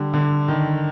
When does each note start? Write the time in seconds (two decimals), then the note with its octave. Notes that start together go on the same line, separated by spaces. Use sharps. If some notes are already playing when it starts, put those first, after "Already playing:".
Already playing: D3 G3
0.14 D3
0.48 D#3